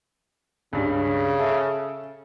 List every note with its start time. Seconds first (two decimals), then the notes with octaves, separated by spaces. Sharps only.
0.73 C#2 G2 C#3
1.39 A4 E5